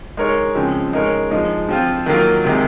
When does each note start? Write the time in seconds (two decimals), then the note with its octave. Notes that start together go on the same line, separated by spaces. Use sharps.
0.17 G#3 D#4 A#4 C#5
0.55 C#3 F3 G#3 C4
0.93 G#3 D#4 A#4 C#5
1.31 F3 G#3 D#4
1.69 F3 C4 F4
2.06 D#3 F#3 A#3 F4
2.44 C3 D#3 G#3